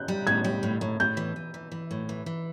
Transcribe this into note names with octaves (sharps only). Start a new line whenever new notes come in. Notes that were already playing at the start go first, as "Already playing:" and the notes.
Already playing: F#6 G6
G3
A2 G#6
G3
A2
A2
A2 G6
E3
E3
E3
E3
A2
E3
E3